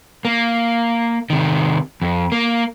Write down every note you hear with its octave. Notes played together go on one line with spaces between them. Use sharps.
A#3
C3 D#3
F2
A#3